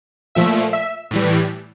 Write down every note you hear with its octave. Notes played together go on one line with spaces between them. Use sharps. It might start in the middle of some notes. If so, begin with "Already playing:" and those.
A#2 F3 A3 E5
E5
A2 E3 G3